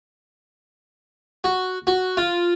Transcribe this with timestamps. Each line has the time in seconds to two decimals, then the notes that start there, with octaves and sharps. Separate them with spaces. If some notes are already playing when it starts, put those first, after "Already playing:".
1.44 F#4
1.87 F#4
2.17 F4